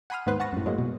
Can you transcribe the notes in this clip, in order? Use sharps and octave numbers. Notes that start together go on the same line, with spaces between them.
F#5 G#5 B5 C6 D#6 F6
D#2 G#2 B3 B4 C5 F#6
F#5 A5 C#6 A#6
F#2 A2
F#3 G#3 A#3
B2